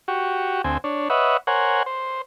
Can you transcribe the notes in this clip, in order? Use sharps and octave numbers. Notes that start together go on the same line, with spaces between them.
F#4 G4 C#6
D2 C4 G#5
D4 C#5
B4 C#5 D#5 E5 F#5
A#4 C5 C#5 F#5 G#5
C5